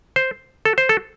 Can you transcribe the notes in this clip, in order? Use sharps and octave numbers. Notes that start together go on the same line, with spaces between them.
C5
A4
C5
A4